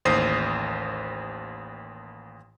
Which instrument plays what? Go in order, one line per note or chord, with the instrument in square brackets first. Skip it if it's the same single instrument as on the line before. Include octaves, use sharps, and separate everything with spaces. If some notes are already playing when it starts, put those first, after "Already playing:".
[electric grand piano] A1 D#2 C5 D#6 C7